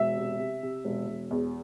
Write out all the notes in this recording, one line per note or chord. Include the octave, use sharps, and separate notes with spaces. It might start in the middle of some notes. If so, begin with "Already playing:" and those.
Already playing: E1 E5
C3
C3
C3
E1
E1
E2